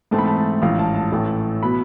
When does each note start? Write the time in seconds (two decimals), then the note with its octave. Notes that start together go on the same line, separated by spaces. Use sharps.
0.11 G#2 E3 A3 C4 A5
0.19 B5
0.26 A5
0.36 A5
0.62 A1 G#2 F3 F5
0.79 A5
0.96 A5
1.12 A1 A2 E3 A3 A5
1.63 B2 B3 B5